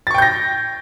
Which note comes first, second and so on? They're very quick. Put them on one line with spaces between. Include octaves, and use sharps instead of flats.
A6 C#6 G5 G6 A#6